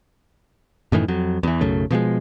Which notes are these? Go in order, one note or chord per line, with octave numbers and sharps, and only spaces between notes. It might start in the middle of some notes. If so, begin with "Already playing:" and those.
F#2 A2 D#3 E3
F2 F#3
E2 E3
B1 F#2 C#3 A3
B2 F3 F#3 G#3